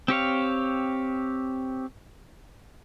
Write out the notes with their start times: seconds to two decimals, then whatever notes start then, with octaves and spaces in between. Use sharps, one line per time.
0.08 C4 G4 C#5 F5